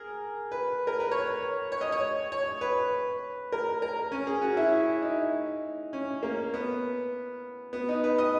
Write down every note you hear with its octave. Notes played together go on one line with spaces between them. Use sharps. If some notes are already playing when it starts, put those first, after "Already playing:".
Already playing: G#4 A#4
B4
A#4
B4
C#5
C#5
D#5
C#5
C#5
B4
A#4
A#4
C#4
G#4
F#4
E4
D#4
C#4
A#3
B3
B3
D#4
B4
D#5